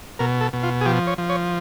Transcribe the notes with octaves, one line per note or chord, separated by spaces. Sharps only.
B2 A#4
A4
B2
F4
G#4
F3 G4
C#5
F3
C#5